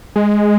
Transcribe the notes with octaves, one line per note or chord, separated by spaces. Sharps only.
G#3